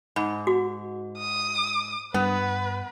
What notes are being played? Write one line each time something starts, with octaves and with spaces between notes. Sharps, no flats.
G#2 B5
F#4
D#6
G2 B3 B4